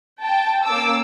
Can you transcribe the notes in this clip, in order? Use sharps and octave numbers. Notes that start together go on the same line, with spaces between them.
G5 A5
A#3 C#4 D6 E6